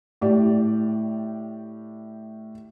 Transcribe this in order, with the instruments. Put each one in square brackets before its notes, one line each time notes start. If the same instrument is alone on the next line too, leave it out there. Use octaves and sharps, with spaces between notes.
[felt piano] A2 G4 D5